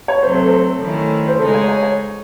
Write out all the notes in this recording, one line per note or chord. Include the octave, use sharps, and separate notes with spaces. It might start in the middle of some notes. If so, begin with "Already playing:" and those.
C#5
C3 F#3 A3 C5
A4
C5
D#3 A3 C#4 E4
C5
C#3 G#3 D#4 G#4 A4
C#5
C#5
C#5